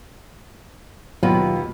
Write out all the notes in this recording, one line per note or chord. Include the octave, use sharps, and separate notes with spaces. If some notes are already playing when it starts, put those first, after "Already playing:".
D#2 B2 F#3 F4 B4